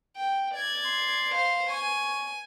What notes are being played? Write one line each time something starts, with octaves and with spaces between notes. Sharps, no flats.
G5
D5 G#6
C6
C5 F5
C#5 G#5